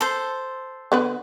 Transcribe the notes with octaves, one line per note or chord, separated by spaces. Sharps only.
A4 C5
D3 B3 B4